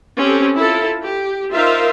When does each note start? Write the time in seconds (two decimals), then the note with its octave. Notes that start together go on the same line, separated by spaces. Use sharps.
0.18 C4 C#4 G4 A4
0.57 E4 F4 A4
1.03 G4
1.53 D#4 F4 A#4 C5 E5 F5